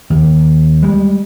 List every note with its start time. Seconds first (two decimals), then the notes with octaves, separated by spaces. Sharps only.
0.10 D#2
0.82 G3 G#3